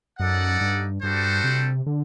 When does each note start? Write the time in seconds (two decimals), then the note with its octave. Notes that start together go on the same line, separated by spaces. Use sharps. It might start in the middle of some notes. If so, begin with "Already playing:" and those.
0.19 F#2 D#4 A4 D5 F#5
0.61 G2
1.03 G2 G3 D4 F#4 A4 C5
1.44 C3
1.86 D3